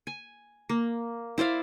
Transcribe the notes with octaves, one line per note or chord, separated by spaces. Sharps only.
G#5
A#3
E4 C5 D5 F5